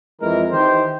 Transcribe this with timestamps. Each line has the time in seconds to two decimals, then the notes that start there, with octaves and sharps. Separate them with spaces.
0.22 F2 E3 G#3 A#4
0.52 D#3 E3 D#4 G4 C5